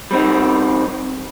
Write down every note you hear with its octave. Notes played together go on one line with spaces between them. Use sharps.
G3 C4 D#4